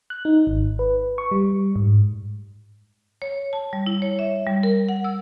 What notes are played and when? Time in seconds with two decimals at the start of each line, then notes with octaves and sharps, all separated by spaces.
0.10 F#6
0.25 D#4
0.47 G#1
0.79 B4
1.18 C#6
1.31 G3
1.76 G#2
3.22 C#5
3.53 A5
3.73 G3
3.86 E4
4.02 C#5
4.19 E5
4.47 G3
4.63 A#4
4.89 F#5
5.04 E6